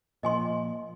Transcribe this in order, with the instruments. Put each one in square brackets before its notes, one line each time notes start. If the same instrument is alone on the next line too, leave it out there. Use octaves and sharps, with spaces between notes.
[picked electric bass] A#2 F3 [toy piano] D#5 G#5 C6